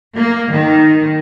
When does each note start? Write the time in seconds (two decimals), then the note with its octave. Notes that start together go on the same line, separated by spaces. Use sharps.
0.17 A#3
0.52 D#3